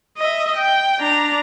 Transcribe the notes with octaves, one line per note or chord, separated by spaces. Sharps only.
D#5 E5
G5
D4 A#5